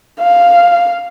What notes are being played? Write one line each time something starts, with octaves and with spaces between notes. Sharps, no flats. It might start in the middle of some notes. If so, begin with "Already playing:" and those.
F5